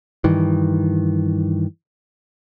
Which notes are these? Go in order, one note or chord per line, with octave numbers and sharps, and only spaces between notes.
G2 D#3 E3